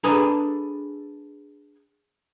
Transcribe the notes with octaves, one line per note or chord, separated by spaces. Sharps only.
D4 G#4 A4 B4 G#5 A#5